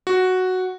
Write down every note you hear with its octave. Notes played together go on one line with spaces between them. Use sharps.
F#4